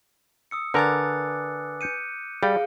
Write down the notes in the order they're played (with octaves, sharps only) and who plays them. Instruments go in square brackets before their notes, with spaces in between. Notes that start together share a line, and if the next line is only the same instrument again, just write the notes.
[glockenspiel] D#6 E6 C#7
[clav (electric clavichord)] D3 A#4 [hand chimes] B4 G#5 A6 [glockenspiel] D6 F#6
[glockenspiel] G6 C#7 D#7
[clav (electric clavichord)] G3 [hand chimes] G#4 F5